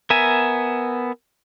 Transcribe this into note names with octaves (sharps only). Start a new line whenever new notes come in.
B3 A#4 E5 G#5